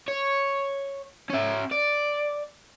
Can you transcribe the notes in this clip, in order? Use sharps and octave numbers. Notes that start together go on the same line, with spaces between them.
C#5
C#4 E5
D5